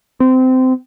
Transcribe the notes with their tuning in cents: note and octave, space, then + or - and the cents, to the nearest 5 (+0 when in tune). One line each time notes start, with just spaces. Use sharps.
C4 -20